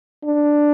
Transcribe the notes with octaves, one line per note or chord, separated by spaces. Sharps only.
D4